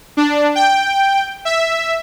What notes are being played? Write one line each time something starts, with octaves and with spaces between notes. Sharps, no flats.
D4
G5
E5